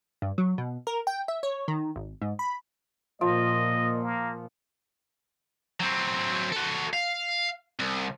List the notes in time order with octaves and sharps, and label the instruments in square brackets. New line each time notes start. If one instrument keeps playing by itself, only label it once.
[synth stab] G2
F#3
B2
A#4
G5
E5
C#5
D#3
G#1
G#2
B5
[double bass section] A#2 [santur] F3 [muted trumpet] D#5
[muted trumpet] A#3
[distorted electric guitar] F#3 C4
F#4 A4
F5
C2